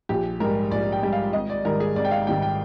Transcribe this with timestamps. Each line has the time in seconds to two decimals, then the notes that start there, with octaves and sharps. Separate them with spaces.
0.09 A#1 G4
0.40 G#2 G3 A#4
0.71 A#1 D5
0.92 G5
1.03 G#2 G3
1.13 F5
1.33 G#1 D#5
1.50 D5
1.65 G#2 D#3 G3 A#4
1.80 G#4
1.96 G#1 D5
2.05 G5
2.11 F5
2.27 G#2 D#3 G3 G5
2.42 G5